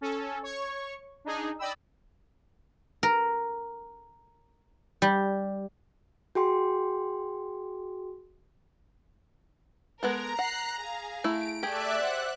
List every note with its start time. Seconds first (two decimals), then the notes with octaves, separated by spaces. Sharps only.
0.01 C#4 A4
0.43 C#5 C#6
1.25 D4 D#4 G#4
1.59 D5 D#5 G5 B5 E6
3.03 A#4
5.02 G3
6.35 F#4 G#4 G5 C6
10.03 G#3 B3 A4 A#4 A#5
10.39 F#5 F#6 C7
10.80 G#4 F5
11.24 A3 E4 D7
11.63 A3 G4 G#4 D5 E5 F#6
12.02 C5 F#5 F#6